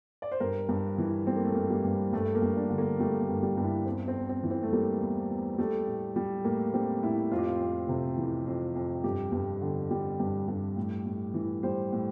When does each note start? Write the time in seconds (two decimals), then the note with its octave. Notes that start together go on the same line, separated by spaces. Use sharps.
0.22 D5
0.32 C5
0.40 G2 A#4
0.69 G2
0.98 E3
1.27 G3 C4
1.36 A#3
1.45 A3
1.54 G2 A#3
1.70 G3
1.84 G2
2.13 G2 A3
2.35 A#3
2.42 G2
2.57 D4
2.70 D3
2.78 A#3
3.00 G3 A3
3.21 A3
3.29 G2
3.43 G3
3.57 G2
3.64 E4
3.85 E2 C4
4.08 C4
4.15 E2
4.29 C4
4.43 E3
4.51 C4
4.63 A3
4.73 G3 A#3
5.00 E2
5.29 E2
5.58 G3 A3
5.87 A2
6.16 G3
6.45 A2 A#3
6.73 G3 C4
7.03 A2 E4
7.31 F2 F4
7.38 G4
7.46 F4
7.60 F2
7.88 C3
8.18 E3
8.47 F2
8.76 F2
9.04 G2 G4
9.32 G2
9.61 D3
9.91 G3
10.20 G2
10.48 G2
10.77 A2
11.06 A2
11.34 E3
11.63 G3 C5
11.93 A2